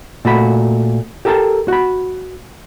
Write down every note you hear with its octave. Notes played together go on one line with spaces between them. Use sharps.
A#2 A3 F#4 B5
G4 A4 A#4 G5 A5
F#4 B5